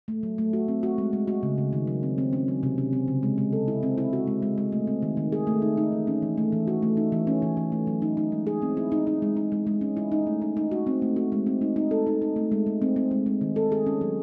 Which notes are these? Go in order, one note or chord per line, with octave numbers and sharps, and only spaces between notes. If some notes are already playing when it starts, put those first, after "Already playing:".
A3
F#3
A3
F#4
C4
F#4
G#3
G#3
F#4
C#3
C#3
D#3
F#3
C4
C4
C#4
F#3
C3
C#4
C4
C#3
G#3
G#3
A4
E4
C4
E4
F#4
G#3
G#3
G#3
A3
C4
D#3
D#3
G#4
A3
D#4
D#4
E3
C#4
E3
A3
E3
F#4
A3
D#4
E3
C#4
E3
E3
A3
F#3
D#4
D#4
G#3
G#4
C4
E4
D#4
D#4
G#3
D#4
G#3
G#3
C#4
E4
D#4
A3
D#4
D#4
F#4
C4
A3
F#4
G#3
C4
D#4
D#4
A4
D#4
D#4
A3
G#3
G#3
C4
C4
G#3
G#3
D#3
A4
G#4
C#4
F#3